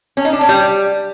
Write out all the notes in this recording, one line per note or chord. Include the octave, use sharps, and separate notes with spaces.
C#4
D#4
D4
C#4
G3